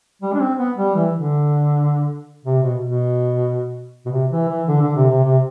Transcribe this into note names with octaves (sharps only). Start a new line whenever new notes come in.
G3
D4
C4
B3
G3
E3
D3
C3
B2
B2
B2
C3
E3
E3
D3
D3
C3
C3
C3